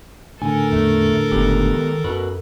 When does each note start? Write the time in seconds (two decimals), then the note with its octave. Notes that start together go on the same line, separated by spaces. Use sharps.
0.42 A2 D3 A4 A#4 G#5
0.72 E2 A3
1.32 F#1 G#3 B3 G4
1.72 D#3
2.04 F#2 F#4 B4